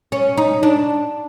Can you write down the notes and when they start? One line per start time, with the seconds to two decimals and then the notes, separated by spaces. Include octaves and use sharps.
0.12 C#4
0.37 D#4
0.63 D4